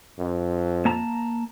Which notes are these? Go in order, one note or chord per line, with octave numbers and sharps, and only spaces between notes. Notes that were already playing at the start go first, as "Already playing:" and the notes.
F2
A#3 A5 A#5